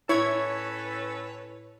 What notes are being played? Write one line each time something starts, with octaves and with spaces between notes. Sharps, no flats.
A2 C#4 E4 A4 B4 C#5 G#6